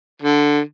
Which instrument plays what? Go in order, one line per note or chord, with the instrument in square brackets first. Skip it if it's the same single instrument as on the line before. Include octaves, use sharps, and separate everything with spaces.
[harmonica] D3